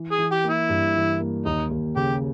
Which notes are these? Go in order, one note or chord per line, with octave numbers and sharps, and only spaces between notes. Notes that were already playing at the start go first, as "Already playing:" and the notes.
Already playing: E3
G#4
E3
G4
A#3
E4
G2
E3
A#3
D#2 D#4
D#2
C#3 G4